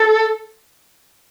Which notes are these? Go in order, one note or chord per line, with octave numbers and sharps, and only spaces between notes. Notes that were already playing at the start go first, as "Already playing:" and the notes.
Already playing: A4